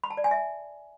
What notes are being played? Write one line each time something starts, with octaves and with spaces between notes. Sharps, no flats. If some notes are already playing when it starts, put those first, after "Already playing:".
B5
A5
D5
G#5
E5